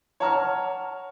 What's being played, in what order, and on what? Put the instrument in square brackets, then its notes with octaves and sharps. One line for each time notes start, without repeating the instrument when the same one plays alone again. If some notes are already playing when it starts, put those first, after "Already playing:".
[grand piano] C#5 F#5 A5 A#5 F6